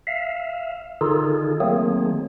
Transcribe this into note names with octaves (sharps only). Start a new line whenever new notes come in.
E5 F5
D3 D#3 D#4 F4 G#4 A4
D#3 F#3 A3 A#3 C4 G#4